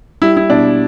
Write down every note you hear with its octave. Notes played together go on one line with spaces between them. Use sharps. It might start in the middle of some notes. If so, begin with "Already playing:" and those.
G3 E4
E4
B2 D4